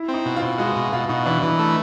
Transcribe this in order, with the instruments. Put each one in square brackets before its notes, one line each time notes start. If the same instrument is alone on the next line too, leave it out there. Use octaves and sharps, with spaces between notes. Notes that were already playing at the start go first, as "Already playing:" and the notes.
Already playing: [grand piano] E4
[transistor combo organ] C4
[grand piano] D#4
[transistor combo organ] B2
[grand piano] F4
[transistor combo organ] B2
[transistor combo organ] G#3 [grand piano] F#4
[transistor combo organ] B2
[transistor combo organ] B2 [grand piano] F4
[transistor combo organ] B2 [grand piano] D#4
[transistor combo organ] E3 [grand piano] D4
[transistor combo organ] E3 [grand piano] D4
[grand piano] D#4
[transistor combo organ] A3 [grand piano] D#4